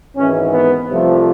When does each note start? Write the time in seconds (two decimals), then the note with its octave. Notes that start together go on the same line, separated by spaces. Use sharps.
0.17 G#1 G#2 E3 C#4
0.53 B3
0.88 C2 C3 F3 A3